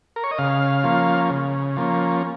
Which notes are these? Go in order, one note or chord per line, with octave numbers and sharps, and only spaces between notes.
A#4
C#5
D#5
C#3 F5
F3 A#3 C#4
C#3
F3 A#3 C#4